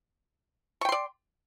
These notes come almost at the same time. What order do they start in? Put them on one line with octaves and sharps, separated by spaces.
C#6 G5 C6 D5